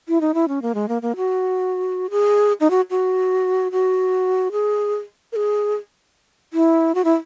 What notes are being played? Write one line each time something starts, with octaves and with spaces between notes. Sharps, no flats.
E4
D#4
E4
C#4
A#3
G#3
A#3
A#3
F#4
G#4
D#4
F#4
F#4
F#4
G#4
A#4
G#4
E4
F#4
E4